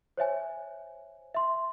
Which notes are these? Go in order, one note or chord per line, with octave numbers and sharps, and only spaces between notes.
C5 C#5 E5 G#5
E5 C6